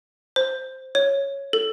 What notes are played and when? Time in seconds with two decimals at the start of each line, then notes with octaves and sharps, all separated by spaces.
0.36 C5
0.95 C#5
1.53 A4